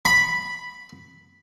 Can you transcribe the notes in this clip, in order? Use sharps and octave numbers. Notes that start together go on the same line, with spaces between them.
B5